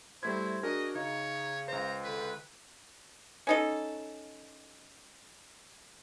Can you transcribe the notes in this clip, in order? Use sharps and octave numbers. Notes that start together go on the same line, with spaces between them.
G3 A3 E4 C5 G#6
D4 F#4 G#4 A#4 D#5
C#3 D#4 C#5
C#2 C5 A#5
D3 B4
C#4 D#4 A4